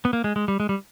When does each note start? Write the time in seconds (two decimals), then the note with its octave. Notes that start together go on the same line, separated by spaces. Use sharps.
0.05 B3
0.13 A#3
0.24 G#3
0.36 G#3
0.48 G3
0.60 G#3
0.69 G3